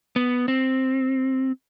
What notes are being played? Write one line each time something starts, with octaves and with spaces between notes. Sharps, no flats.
B3
C4